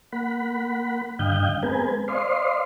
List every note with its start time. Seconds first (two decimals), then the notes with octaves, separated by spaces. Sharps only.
0.12 A#3 F#5 B5
1.19 G2 D3 D#5 F5 G5 G6
1.63 G#3 B3 C4 A#4 B4 G#5
2.08 C5 D5 D#5 F5 C6